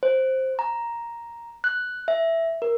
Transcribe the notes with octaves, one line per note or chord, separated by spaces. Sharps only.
C5
A#5
F#6
E5
A#4